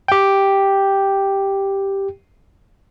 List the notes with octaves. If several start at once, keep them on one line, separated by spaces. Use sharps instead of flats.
G4 G5